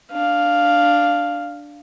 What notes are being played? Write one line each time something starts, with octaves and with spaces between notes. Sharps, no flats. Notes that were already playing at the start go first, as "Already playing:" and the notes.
D4 F5